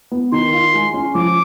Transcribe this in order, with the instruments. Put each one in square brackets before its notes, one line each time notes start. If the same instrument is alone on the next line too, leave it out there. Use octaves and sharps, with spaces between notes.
[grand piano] B3
[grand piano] D#3 [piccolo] C6
[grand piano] F4
G#3
C#4
[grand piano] F3 [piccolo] D6